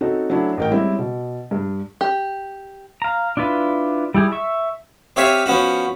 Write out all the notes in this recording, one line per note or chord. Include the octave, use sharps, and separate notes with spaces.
C4 C#4 D#4 F#4 A4
F#3 A3 C#4 D4 E4
A1 A#4 G5
G3 G#3 C4 C#4 E4 G#4
B2
G2
G4
F5 A#5
D4 E4 F4 B4
G3 E4 G4 G#4
E5 C#6
C4 G4 C#5 E5 F5 G#5
F3 B3 C#4 F#4